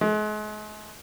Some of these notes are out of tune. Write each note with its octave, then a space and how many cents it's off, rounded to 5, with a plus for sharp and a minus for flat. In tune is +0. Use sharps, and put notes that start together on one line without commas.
G#3 +40